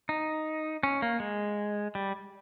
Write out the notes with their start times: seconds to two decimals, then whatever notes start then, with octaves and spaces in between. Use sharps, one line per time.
0.09 D#4
0.83 C#4
1.02 A#3
1.20 G#3
1.95 G3